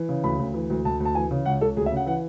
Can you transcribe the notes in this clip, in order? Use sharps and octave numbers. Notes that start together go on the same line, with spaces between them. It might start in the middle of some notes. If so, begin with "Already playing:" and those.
Already playing: E3
C#3
D2 B5
D2
E3
D2
D2 A5
D2
A5
E3 G#5
C#3
C#2 F#5
C#2 A4
D2 G#4
E5
C#3 F#5
E3 F#5